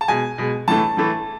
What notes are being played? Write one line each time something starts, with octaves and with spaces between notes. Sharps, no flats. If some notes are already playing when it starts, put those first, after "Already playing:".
A5
B2 G#3 G#5
B2 G#3
A2 E3 A3 A5
A2 E3 A3